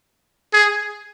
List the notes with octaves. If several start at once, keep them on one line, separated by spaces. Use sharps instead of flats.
G#4